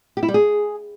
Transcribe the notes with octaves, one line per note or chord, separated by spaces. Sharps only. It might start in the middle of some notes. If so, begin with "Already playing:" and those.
G4
E4
G3
G#4